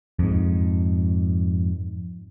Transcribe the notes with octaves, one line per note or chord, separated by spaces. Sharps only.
F2 G#2